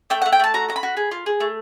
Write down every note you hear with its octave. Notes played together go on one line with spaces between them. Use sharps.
A3 G5
F#5
A3
G5
A3 A5
F#4 A#5
F#4 A#5
B5
F#4
G#4
F4
G#4
A3